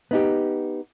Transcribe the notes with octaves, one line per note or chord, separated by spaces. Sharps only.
B3 D#4 G4